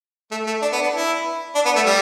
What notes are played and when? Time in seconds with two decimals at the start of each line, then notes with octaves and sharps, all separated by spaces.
0.31 A3
0.47 A3
0.62 D4
0.72 B3
0.82 D4
0.93 E4
1.55 D4
1.65 B3
1.76 A3
1.86 G3